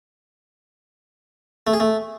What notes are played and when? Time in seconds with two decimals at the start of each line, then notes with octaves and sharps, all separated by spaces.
1.67 A3
1.73 G#4
1.80 A3